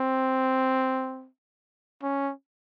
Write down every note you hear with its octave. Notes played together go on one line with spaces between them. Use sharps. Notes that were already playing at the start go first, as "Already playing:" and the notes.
Already playing: C4
C#4